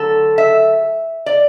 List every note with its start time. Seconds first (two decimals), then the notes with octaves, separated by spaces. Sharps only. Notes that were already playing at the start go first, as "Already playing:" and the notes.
Already playing: D3 F#3 A3 A4
0.38 E5
1.26 D5